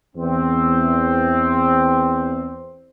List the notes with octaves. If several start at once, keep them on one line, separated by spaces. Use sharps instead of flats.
E2 C4